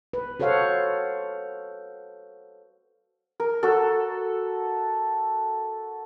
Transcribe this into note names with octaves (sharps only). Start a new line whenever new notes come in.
B4
F#4 A4 C5 C#5 F5 F#5
A#4
F#4 A4